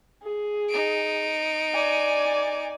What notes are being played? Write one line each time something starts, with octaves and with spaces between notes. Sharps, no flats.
G#4
D#4 D7
D5 G#5